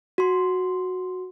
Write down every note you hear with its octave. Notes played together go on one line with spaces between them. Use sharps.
F#4 C6